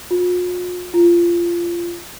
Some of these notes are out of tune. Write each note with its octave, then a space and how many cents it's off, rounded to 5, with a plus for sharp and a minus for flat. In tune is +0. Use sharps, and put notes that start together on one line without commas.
F4 +45
F4 -20